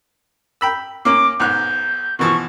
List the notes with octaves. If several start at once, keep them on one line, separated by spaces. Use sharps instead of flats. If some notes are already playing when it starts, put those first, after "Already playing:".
G5 B5 E6
A#3 C#4 D6
B1 G#2 F#6 G6
B2 E3 F3 C#6